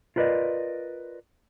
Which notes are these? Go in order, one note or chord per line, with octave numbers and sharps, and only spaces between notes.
F4 A#4 B4 D5 D#5